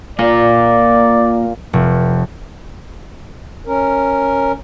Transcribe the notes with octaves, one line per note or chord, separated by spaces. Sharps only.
A#2 A#3 F4 A#4 D5
F1
C#4 A#4